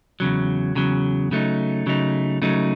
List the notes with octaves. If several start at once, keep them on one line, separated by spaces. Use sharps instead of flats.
E2 C#3 F#3
E2 C#3 F#3
C#3 F#3 A3 D#4
C#3 F#3 A3 D#4
C#3 F#3 A3 D#4